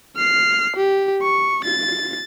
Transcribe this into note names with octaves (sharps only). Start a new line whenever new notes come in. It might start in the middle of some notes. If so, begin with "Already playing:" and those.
F6 C7
G4
C#6
A6